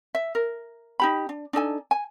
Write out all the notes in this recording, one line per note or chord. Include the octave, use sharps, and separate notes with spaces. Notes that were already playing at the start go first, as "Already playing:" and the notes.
E5
A#4
D#4 G4 B5
D4
D4 D#4 A4 G#5
G#5